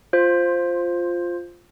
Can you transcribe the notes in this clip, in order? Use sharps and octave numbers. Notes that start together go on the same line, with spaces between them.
F4 C5